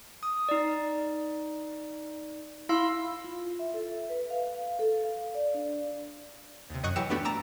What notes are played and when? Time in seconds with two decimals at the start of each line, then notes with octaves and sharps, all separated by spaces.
0.23 D#6
0.49 D#4 D5
2.69 E4 F5 C6 E6
3.24 F4
3.59 E5
3.74 A4
3.94 E5
4.09 B4
4.30 F5
4.55 F5
4.79 A4
5.05 F5
5.35 D5
5.54 D4
6.70 D#2 C3
6.83 F#2 D#5 C#6 F#6
6.96 E3 F#3 G4 E6 C#7 E7
7.10 A3 B3 D4 F#4 G4
7.25 A5 A#5 D6 E6